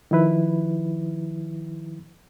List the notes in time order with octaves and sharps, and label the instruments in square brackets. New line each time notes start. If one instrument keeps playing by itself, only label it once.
[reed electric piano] D#3 F3 E4 B4